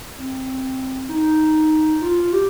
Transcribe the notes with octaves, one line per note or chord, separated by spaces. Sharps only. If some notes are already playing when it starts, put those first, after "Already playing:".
C4
D#4
F4
G4